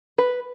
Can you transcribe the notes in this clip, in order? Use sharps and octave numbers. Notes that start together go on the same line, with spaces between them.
B4